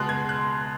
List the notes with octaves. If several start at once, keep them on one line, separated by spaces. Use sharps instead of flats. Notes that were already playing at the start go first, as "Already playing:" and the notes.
Already playing: C#2 B2 G#3 F#6
G#6
F#6